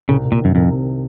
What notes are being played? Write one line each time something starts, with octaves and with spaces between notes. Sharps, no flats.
C2 C#3
C2
A#2
F#2 D#3
C2 F2
C3